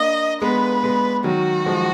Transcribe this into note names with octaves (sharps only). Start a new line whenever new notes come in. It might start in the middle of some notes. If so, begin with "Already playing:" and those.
Already playing: A#3 D4 D#5
G#3 B3 B4
G#3 B3
D#3 F#3 F#4
F3 G#3